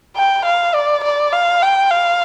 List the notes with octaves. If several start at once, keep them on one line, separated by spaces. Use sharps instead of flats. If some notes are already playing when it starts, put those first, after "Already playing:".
G5
F5
D5
D5
F5
G5
F5